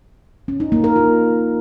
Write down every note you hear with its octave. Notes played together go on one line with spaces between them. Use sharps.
C#4
D#4
A#3
A#4
F4